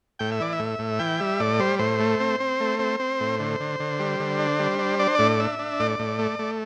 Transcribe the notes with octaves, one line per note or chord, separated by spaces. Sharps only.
A2 G5
E5
E3 D5
E5
A2
A2
E3 G5
G3 E5
A2 D5
G3 C5
A2 C5
A3
C4
C4
A3
C4
C4
A2
D3
D3
D3
G3
D3
D4
G3
D4
D4 D5
C5
A2 D5
D4 E5
D4
A2 D5
A2
A3
A3